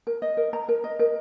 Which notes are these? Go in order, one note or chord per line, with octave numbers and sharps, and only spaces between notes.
A#4
D#5
A#4
A#5
A#4
D#5
A#4